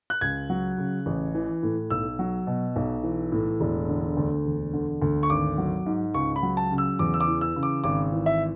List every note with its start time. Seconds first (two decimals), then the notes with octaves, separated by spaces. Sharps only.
0.10 F#6
0.21 C#2 G#6
0.50 F#3
0.78 C#3
1.06 A1
1.35 E3
1.63 A2
1.90 B1 E6
2.19 F#3
2.47 B2
2.76 B1
3.03 E3
3.32 A2
3.60 E1
3.89 D3
4.17 D2
4.45 E1
4.73 D3
5.02 D2
5.23 C#6
5.30 G#1 D6
5.58 F#3
5.86 G#2
6.14 C#2 C#6
6.36 B5
6.43 F#3
6.57 A5
6.71 C#3
6.78 E6
6.99 E2 D6
7.14 E6
7.20 D6
7.27 E3
7.41 E6
7.56 C#3
7.63 D6
7.84 G#1 D6
8.12 E3
8.26 E5